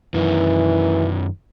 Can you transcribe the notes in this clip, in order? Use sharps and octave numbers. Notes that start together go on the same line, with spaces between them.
F#2 D#3 E3